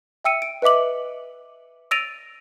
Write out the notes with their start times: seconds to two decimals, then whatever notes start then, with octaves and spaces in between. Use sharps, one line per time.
0.24 E5 G5 E6 C#7 D#7
0.42 D7
0.62 B4 D#5 E5 D6 F#7
1.91 E6 A6 A#6 D7 D#7 F7